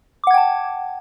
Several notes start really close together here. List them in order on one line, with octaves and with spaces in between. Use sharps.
D6 F#5 G#6 G5 A5